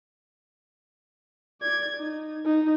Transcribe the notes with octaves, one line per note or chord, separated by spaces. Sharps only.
D5 G#6
D#4
D#4